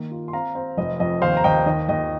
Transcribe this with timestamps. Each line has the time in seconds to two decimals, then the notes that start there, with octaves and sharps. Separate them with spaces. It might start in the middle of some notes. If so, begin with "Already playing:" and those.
Already playing: D#3 A#3
0.11 F4
0.28 C6
0.33 C4 F5 A#5
0.55 C4
0.77 F1 D#5
1.00 F2 D#5
1.22 D#2 C5 F5
1.37 A#5
1.44 D#2 D#5 G5
1.66 D#3 D#5
1.89 D#2 D#5